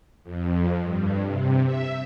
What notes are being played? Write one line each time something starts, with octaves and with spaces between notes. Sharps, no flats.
F2
G2
C3
E5